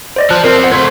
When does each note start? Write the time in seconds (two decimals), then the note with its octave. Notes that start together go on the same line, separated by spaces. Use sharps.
0.16 C5 D5 D#5
0.30 F3 C5 A5 F#6
0.44 F3 C4 A#4
0.60 C5 F#5
0.72 A3 C5 G#6